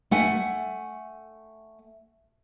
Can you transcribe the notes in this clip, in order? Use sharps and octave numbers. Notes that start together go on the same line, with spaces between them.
A3 E5 F#5 G#5